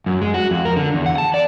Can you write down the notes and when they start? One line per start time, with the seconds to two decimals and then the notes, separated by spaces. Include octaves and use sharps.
0.06 F#2
0.21 G#3
0.34 F#4
0.51 F2
0.65 A#4
0.76 D3
0.94 E2
1.06 F#5
1.18 A5
1.34 D5